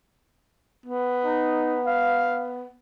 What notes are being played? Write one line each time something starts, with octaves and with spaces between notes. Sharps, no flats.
B3
D#4
F5